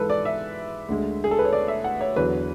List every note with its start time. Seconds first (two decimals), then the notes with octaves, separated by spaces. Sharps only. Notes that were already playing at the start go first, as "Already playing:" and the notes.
Already playing: G#2 E3 G#3 A4 B4
0.10 D5
0.25 E5
0.89 D2 D3 G#3
1.24 G#4
1.31 A4
1.39 B4
1.45 C#5
1.53 D5
1.68 E5
1.84 F#5
2.01 C#5
2.16 E2 D3 F#3 B4